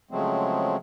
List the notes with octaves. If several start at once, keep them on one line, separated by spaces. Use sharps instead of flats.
C#3 F3 F#3 G#3 A3 C4